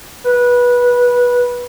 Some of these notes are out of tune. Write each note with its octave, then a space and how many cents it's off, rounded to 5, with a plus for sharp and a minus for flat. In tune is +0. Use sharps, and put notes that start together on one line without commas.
B4 -20